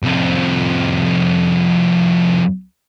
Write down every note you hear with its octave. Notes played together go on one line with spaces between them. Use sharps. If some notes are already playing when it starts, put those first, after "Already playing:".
C2 F2